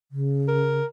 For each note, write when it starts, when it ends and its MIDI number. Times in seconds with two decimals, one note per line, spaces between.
0.12 0.80 49
0.48 0.86 70